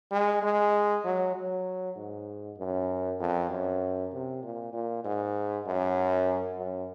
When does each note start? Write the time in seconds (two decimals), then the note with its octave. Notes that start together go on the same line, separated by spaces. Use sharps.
0.11 G#3
0.43 G#3
1.05 F#3
1.35 F#3
1.96 G#2
2.58 F#2
3.20 F2
3.50 F#2
4.12 C3
4.43 A#2
4.73 A#2
5.04 G#2
5.66 F#2
6.57 F#2